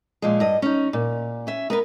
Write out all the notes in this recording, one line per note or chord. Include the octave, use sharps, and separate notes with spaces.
A#2 F3 G#3
G2 D#5
C#4 D#4
A#2
C#4 E5
B3 A#4 B4